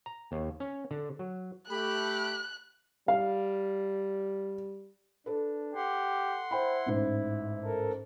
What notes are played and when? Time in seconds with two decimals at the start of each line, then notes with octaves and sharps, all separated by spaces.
0.06 A#5
0.32 D#2
0.60 C#4
0.91 D3
1.19 F#3
1.70 A3 G4 B5 F#6
3.08 G3 F5
5.26 D4 A4 B4
5.75 G4 F#5 C6
6.51 E4 C5 G5 B5
6.86 A1 G#2
7.64 A4 A#4